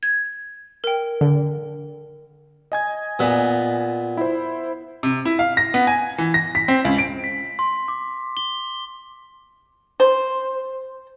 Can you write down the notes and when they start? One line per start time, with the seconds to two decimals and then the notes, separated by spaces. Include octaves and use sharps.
0.03 G#6
0.84 A#4 G5
1.21 D3
2.72 D#5 G#5 G#6
3.19 A#2 B3
4.17 E4 C5
5.03 C3
5.25 E4
5.39 F5
5.57 A#6
5.74 B3
5.87 G#5
6.18 E3
6.34 A#6
6.55 B6
6.68 C4
6.85 C#2
6.98 D7
7.24 B6
7.59 C6
7.88 D6
8.37 G7
10.00 C5